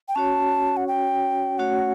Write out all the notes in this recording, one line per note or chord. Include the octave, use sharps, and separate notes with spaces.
G5
C#4 F#4 C#5 A5
F#5
G5
A3 C#4 F#4 C#5 F#5